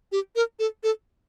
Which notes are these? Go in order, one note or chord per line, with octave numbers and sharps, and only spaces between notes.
G4
A#4
A4
A4